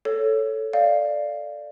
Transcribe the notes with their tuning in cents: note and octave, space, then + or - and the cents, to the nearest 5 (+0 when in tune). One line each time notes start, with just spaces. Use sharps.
A4 +0 C#5 +0
D5 +5 F5 -15